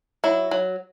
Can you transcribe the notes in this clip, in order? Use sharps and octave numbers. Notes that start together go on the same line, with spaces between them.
F#3 E4
F#3